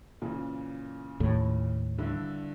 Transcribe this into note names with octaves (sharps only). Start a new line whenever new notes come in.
A#2 C#3 E3
D#2 A2
G2 D3 E4